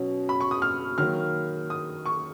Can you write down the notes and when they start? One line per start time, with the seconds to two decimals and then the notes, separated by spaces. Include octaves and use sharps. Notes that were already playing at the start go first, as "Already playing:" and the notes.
Already playing: B2 F#3 C#4
0.29 B5
0.41 C#6
0.51 D#6
0.62 F6
0.98 D#3 F#3 A#3 F6
1.70 D#6
2.06 C#6